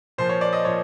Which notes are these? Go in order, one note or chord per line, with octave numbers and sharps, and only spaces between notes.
A#2 F3 C5
C#5
D5
D#5
A#2 F3 C#5